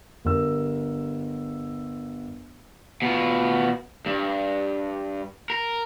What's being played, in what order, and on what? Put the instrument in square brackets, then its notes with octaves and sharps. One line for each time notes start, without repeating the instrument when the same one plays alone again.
[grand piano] G1 A#4 E6
[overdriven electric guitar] B2 F4
G2
A#4